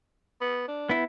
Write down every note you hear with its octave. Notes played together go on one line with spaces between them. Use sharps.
B3
D4
B3 E4